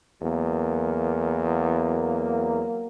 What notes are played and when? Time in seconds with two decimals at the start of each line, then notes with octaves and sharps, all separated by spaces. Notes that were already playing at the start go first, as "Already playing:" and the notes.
0.22 E2 F#3 A#3